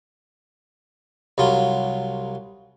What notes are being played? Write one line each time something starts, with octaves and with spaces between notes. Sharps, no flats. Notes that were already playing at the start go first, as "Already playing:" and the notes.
C2 F#3 F4